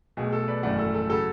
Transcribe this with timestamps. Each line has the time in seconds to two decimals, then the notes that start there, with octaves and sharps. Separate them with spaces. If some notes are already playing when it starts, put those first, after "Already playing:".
0.17 B1 B2 A3 G#4
0.32 A4
0.48 B4 D5
0.63 G#1 F#2 E3 A3 D5 F#5
0.79 A4
0.94 A4
1.09 C#3 F#3 A4